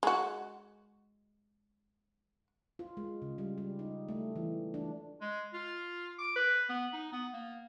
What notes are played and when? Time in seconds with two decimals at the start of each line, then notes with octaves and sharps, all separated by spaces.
0.03 G#3 F#4
2.79 F4
2.97 G#3
3.22 C#3
3.38 G3
3.58 G3
3.79 D#4
4.09 A3
4.36 E3
4.74 D4
5.21 G#3
5.54 F4
6.19 D6
6.36 B4
6.69 B3
6.93 D#4
7.12 B3
7.34 A#3